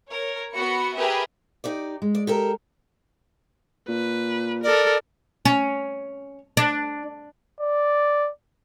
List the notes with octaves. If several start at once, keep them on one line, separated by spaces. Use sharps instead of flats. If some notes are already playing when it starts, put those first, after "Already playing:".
A#4 C#5
B3 F#4 B5 C#7
G4 G#4 A#4 B4 E5
D#4 G4 D5
G#3
D5
G4 A4 A#4
A#2 B4
A4 A#4 D5
C#4
D4
D5